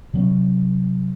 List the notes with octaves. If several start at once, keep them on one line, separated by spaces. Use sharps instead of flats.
C3 F#3 B3 C#4